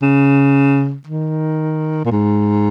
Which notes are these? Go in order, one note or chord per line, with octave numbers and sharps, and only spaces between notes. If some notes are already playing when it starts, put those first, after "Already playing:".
C#3
D#3
A#2
G#2